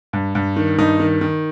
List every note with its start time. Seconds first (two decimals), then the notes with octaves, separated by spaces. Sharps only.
0.13 G2
0.35 G2
0.56 D#3
0.78 G2 D#4
1.00 D#3
1.21 D#3